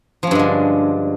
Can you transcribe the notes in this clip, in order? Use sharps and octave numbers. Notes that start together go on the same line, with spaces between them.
G2 D3 F3 G#3 C#4